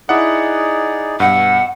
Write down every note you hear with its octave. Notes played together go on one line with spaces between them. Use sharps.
D#4 E4 G#4 D5 F#5
G2 B2 F#5 E6